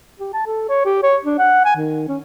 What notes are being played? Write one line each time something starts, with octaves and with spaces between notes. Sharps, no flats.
G4
A5
A4
C#5
G4
C#5
D4
F#5
G#5
D#3
C#4